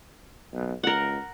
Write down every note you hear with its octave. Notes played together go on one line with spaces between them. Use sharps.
B1
C#2 A#4 F#5